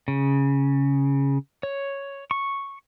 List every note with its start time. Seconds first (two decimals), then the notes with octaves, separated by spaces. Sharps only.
0.08 C#3
1.63 C#5
2.31 C#6